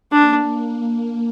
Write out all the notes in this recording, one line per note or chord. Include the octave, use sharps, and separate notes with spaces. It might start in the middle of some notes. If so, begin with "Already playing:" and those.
A#3 D4